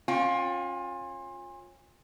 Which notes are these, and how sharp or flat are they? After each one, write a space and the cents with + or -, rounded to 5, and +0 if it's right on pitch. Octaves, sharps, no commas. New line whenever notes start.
C#4 -30 F4 +25 G5 +15